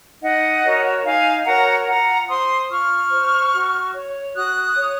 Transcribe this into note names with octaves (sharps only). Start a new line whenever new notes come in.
D#4 D#5 F#5
F#4 A#4 C#5
D#4 F5 G#5
F#4 A#4 C#5 F#5 A#5
F4 F#5 A#5
C5 C6 D#6
F4 C#6 F6
C5
F#4
C#5
F#4 D#6 F#6
C#5